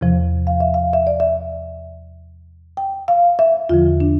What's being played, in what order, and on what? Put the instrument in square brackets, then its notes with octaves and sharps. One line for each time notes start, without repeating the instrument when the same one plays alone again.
[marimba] E2 C3 F3
F5
E5
F5
E5
D5
E5
G5
F5
E5
E2 D3 F3 F4
D4